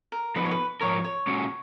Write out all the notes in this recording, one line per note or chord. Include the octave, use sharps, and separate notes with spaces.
A#4
F3 B3 D#4 B4
C#5
B4
G#2 F3 A#4 C#5
C#5
A#2 G#3 C#4 F#4